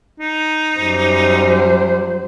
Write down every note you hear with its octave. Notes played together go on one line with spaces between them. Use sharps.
D#4
F#2 F#3 G3 C5